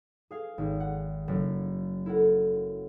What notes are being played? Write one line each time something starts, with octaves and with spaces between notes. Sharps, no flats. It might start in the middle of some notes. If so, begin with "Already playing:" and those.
G#4 F5
G#1
F#5
F#1
E4 A4 A#4 F#5